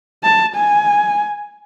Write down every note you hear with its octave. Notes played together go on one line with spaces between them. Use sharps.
A5
G#5